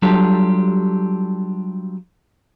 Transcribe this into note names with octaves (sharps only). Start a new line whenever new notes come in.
F#3 G3 D4 F4 G4 A4